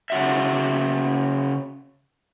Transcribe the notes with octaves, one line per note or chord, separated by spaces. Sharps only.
C#3 F#4 E5